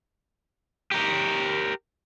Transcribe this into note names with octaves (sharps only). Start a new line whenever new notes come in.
G4 A#4